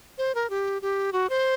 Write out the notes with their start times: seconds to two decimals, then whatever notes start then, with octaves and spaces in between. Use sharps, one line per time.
0.18 C5
0.35 A#4
0.50 G4
0.82 G4
1.13 F#4
1.30 C5